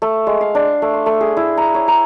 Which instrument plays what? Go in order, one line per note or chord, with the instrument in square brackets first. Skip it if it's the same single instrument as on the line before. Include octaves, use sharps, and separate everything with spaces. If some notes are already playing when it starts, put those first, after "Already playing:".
[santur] A3
G#3
F5
D4
A3
C6
A3
G#4
E4
A#5
C#5
A#5